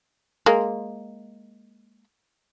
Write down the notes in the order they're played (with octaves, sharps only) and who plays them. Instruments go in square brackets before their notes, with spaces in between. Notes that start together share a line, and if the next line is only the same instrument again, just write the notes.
[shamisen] G#3 A#3